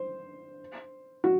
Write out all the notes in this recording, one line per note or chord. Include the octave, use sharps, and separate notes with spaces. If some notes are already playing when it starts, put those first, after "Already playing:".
Already playing: C5
F#4